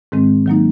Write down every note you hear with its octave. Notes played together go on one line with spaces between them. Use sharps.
G#2 D#3 G#3 C4
D#3 F#3 A#3 D#4